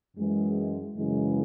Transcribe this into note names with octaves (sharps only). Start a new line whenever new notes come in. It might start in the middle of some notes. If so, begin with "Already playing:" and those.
F#2 E3 G#3
F#2 C#3 E3 G#3